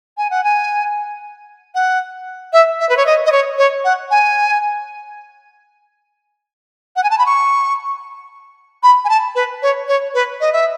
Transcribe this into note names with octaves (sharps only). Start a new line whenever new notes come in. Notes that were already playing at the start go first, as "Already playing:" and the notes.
G#5
F#5
G#5
F#5
E5
E5
B4
C#5
D#5
D#5
C#5
C#5
F#5
G#5
F#5
G#5
A5
B5
C#6
B5
G#5
A5
B4
C#5
C#5
B4
D#5
E5